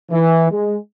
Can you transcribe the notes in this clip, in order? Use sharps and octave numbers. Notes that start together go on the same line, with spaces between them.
E3
G#3